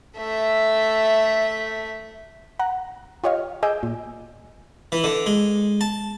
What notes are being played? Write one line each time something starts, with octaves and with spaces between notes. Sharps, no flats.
A3 E5
F#5 A#5 F#6
F4 G4 C#5 D#5 F5
G#4 D#5 G#5 D6 E6 G6
A#2
E3
D3
G#3
A5